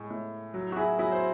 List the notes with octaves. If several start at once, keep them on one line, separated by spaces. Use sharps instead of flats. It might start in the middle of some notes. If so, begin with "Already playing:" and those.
Already playing: A2 G#3
A2
F#3
F#4
E4 G#4
F#3 E4 G#4
C5